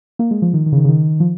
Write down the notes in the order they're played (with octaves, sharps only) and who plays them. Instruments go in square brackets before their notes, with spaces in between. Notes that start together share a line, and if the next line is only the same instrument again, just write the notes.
[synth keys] A#3
G#3
F3
D#3
D#3
C#3
D#3
C#3
D#3
F3